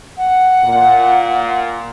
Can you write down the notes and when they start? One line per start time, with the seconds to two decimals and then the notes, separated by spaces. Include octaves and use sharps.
0.17 F#5
0.63 A#2